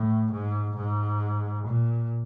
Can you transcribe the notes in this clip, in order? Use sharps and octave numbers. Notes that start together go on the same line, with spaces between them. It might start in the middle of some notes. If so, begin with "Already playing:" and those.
Already playing: A2
G#2
G#2
A#2